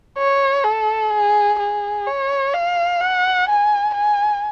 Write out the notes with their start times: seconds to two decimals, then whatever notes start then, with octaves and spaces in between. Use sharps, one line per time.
0.18 C#5
0.64 A4
1.12 G#4
1.60 G#4
2.07 C#5
2.54 F5
3.01 F#5
3.49 G#5
3.95 G#5